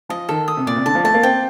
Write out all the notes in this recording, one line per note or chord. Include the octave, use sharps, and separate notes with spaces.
F3 D#5
D#3 A4
D#6
C3
A#2 D5
C3
D3 A5
F3
A3 A5
A#3
C4 G5